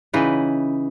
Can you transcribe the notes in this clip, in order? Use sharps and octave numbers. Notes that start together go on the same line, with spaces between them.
C#3 E3 D#4 B4